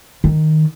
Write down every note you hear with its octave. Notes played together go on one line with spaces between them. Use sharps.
D#3